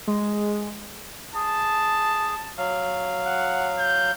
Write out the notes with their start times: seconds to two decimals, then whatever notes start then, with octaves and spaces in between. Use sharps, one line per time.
0.07 G#3
1.35 G#4 A5
2.58 F#3 F5
3.27 F#5
3.79 G6